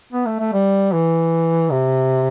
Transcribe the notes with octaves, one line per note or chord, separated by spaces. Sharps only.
B3
A3
A3
G3
E3
C3